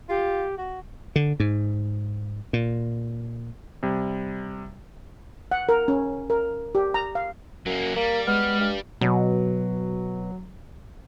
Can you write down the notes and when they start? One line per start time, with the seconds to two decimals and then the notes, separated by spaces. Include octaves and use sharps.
0.09 F4 G4
0.58 F#4
1.16 D3
1.40 G#2
2.53 A#2
3.83 C3 G3
5.51 F#5
5.69 A#4
5.88 C#4
6.30 A#4
6.75 G4
6.94 A#5
7.15 F5
7.66 F#2 F#3 A#3
7.96 G3 A#3
8.27 G#3 B3 F6
8.60 G2
9.01 B2 F#3